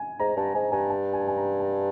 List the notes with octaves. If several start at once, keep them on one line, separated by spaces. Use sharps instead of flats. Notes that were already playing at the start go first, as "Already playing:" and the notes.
Already playing: G#5
G#2 A#5
G2 A5
G#2 G#5
G2 G#5
A5
G#5
A5
G#5
A#5
A5